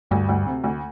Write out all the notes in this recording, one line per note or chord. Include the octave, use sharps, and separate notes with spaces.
D2 G2
D2
C3
D2